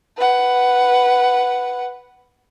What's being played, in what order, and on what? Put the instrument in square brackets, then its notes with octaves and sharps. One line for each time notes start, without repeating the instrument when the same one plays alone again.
[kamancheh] B4 F#5